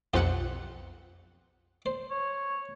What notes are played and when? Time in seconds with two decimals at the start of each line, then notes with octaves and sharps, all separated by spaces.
0.14 B1 F2 F4 G4 C5 F#5
1.86 C5
2.11 C#5